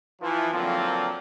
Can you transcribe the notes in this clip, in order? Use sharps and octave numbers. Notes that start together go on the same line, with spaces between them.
E3 F3
D3 F3 F#3 A#3 C4